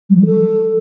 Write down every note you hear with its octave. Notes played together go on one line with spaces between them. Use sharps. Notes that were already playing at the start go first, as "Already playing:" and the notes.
G3
F3
G3
A4